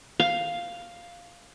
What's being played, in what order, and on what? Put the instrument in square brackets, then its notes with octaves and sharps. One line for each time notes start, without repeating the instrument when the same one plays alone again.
[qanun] F5